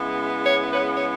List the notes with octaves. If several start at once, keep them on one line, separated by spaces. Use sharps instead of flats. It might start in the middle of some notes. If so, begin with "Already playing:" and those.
Already playing: C#3 G#3 B3 E4
C#5
B4
C#5
C#5